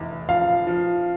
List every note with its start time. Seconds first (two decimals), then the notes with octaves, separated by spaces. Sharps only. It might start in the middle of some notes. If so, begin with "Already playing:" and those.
Already playing: F1 E2
0.29 F3 F5
0.67 F3